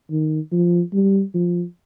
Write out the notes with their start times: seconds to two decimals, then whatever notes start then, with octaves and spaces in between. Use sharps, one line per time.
0.11 D#3
0.52 F3
0.93 G3
1.34 F3